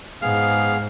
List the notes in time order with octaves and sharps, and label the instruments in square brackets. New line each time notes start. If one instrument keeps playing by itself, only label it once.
[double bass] G#2 [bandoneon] B3 G#4 [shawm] F5